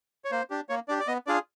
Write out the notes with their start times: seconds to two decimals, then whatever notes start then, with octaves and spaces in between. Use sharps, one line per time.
0.25 C#5
0.31 A#3 C5
0.50 D4 G4
0.69 A#3 C#5
0.88 D4 G4 D5
1.00 D5
1.07 B3 D#5
1.27 D4 F4 G#4 D5